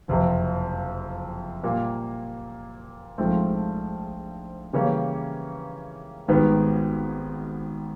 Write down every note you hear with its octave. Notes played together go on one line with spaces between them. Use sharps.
F#1 F2 C3
A#2 G3 A#3
A#1 G#2 F3 A3 C4
C#3 E3 G3 A#3 C#4
G#1 G#2 D#3 G3 B3